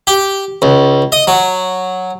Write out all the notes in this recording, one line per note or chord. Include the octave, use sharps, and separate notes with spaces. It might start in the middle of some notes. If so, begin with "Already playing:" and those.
G4
C#2
D#5
F#3